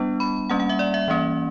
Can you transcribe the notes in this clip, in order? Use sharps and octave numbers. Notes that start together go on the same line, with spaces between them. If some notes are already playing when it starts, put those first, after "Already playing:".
Already playing: G3 B3 D4
B5
G3 A#3 C#4 F#5
F#5
E5
D5
E5
E3 A#3 C#4